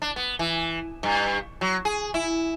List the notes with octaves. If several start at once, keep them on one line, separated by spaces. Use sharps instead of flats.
D4
B3
E3
G2
F#3
G#4
E4